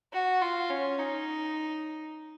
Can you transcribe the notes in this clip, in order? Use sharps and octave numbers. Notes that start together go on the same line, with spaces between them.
F#4
F4
C#4
D#4